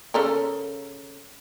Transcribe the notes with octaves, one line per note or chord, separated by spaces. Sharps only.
C#3 A4 A#4